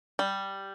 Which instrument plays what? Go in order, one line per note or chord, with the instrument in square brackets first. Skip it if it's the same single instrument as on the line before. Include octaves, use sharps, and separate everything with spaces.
[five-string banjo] G3